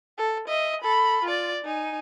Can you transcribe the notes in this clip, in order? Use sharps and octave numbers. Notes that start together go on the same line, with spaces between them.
A4
D#5 E5
A4 B5
F4 D5
D#4 G#5